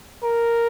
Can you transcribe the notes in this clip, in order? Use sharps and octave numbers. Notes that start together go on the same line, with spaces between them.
A#4